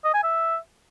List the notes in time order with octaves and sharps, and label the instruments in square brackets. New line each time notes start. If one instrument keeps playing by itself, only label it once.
[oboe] D#5
G#5
E5